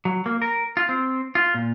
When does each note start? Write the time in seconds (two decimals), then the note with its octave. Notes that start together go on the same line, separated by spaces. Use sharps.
0.05 F#3
0.26 A#3
0.42 A#4
0.77 F4
0.89 C4
1.35 F4
1.54 A#2